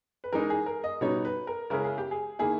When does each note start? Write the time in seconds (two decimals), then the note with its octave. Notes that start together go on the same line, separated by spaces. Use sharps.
0.24 B4
0.33 E3 G#3 D#4 A#4
0.50 G#4
0.66 A#4
0.84 D#5
1.01 B2 G3 B3 D#4 C#5
1.25 B4
1.47 A#4
1.70 C#3 G#3 C#4 E4 A#4
1.84 G#4
1.98 G4
2.11 G#4
2.39 D#3 A#3 E4 G#4